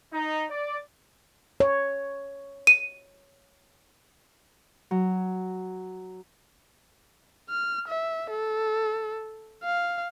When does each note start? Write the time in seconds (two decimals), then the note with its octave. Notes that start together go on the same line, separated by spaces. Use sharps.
0.13 D#4
0.49 D5
1.60 C#5
2.67 D#7
4.91 F#3
7.49 F6
7.88 E5
8.30 A4
9.63 F5